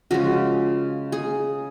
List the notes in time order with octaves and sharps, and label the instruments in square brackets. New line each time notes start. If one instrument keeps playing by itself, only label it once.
[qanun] C#3 F3 G#3 F#4
G#4